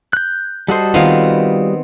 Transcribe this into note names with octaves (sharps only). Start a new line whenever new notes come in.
F#6 G6
G3 F#4 A4 C5 D#5
D#3 B3 C4 F4 F5